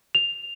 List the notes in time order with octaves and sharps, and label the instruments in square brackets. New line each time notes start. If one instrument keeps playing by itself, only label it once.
[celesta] F7